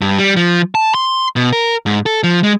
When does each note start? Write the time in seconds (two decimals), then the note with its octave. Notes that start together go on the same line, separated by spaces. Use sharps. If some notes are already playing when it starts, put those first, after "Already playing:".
0.01 G2
0.18 G3
0.36 F3
0.75 A5
0.94 C6
1.36 B2
1.52 A#4
1.86 G#2
2.06 A4
2.24 F3
2.43 G#3